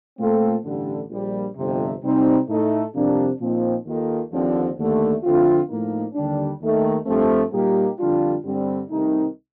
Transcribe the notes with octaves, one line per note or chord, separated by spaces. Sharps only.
A#2 A3 C4 F4 A4
A1 G2 D3 G3
A#1 A#2 G3
G1 F2 C3
C3 G3 C4 D#4
A2 A3 D#4 A4
F2 C3 G3 A#3 D4
A#2 F3 C4 D#4
D#2 D#3 A#3 F4 A4
D#2 D3 F3 C4
D#2 D3 A3
F2 D3 A3 C4 F4
A2 F3 A#3 D#4
D#2 D3 G3 D4
D#2 D#3 A3
G2 F3 A3 C4
A#2 G3 A#3 D#4 G4
F2 D3 G3 D4 F4
G2 D3 G3 C4
C2 C3 D#3 A3 D#4